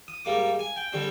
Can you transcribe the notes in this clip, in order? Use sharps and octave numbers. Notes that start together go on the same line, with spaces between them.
D#6
G#2 G3 A#3 D6
G#5
G5
D3 G3 C4